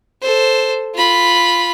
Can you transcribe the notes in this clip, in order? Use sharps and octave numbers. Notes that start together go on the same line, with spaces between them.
A4 C5
F4 B5